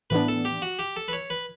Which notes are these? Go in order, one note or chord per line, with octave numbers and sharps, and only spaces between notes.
A2 E3 B3 D4 B4
A4
G4
F#4
G4
A4
B4
C#5
B4